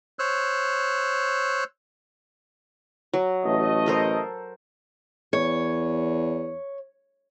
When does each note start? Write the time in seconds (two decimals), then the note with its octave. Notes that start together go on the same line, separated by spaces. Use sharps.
0.19 C5 C#5 E6 F#6
3.13 F#3
3.44 A1 A3 D#5
3.86 A4 A#4 C5
5.33 E2 C#5